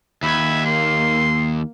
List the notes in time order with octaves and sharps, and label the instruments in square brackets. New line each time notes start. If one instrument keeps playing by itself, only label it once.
[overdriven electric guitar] D#2 [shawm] E5 [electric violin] B5 G#6
[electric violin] A#3 [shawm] C6